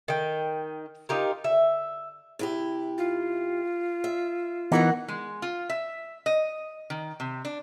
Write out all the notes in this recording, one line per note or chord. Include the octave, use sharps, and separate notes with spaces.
D#3 G5
D#4 F4 G4 A#4
E5
C3 E4 G4
F4
E5
E3 B3 D#4 F#4 A#4 F#5
G#3
F4
E5
D#5
D#3
C3
D4